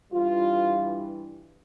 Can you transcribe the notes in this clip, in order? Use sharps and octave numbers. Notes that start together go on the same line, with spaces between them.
G2 E3 G3 F4